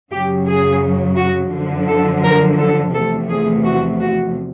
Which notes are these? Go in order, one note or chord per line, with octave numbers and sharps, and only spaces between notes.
F#2 C#3 F#3 G4
G#4
F#4
F#2 D3 F3
A4
A#4
A4
E2 C3 F3 A3 A4
G#4
F#4
F#4